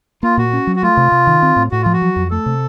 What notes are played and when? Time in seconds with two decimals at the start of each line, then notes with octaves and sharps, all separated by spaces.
0.23 A#3 F4
0.37 A#2 F#4
0.53 C#4
0.67 F#3
0.76 F#4
0.83 A3 F4
0.97 C3
1.12 C3
1.27 D#3
1.43 C4
1.56 A2
1.71 A2 F#4
1.82 F3 F4
1.93 F#4
2.02 F#3
2.16 F2
2.31 A3 A4
2.46 C3